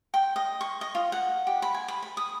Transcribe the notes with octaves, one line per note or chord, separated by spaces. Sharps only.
G5
D#5
C#6
D#5
F4
F#5
G4
B5
G#5
B5
B5
D#6